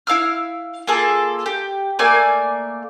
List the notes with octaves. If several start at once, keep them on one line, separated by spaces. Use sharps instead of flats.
E4 F5 E6 F6
A#3 F4 G#4 A4
G4
A3 A#3 D5 G#5